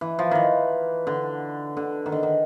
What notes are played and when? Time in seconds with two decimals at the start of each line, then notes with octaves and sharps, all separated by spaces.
0.01 E3
0.19 F3
0.31 D#3 E3
1.07 D3
1.77 D3
2.06 D#3
2.12 D3
2.23 D#3